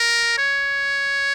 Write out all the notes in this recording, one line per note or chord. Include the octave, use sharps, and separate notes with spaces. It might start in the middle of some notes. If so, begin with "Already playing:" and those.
Already playing: A#4
C#5